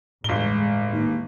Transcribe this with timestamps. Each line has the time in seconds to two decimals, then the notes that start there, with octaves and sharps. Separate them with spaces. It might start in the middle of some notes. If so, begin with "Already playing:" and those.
0.24 G1 E2 A2 G#3 G7
0.92 D#2